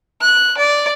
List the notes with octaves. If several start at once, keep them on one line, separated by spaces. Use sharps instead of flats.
F#6
D5